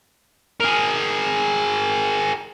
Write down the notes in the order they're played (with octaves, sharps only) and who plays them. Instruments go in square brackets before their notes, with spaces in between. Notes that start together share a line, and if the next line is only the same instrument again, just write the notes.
[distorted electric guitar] G#4 A#4